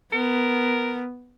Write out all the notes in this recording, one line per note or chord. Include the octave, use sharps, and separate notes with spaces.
B3 A#4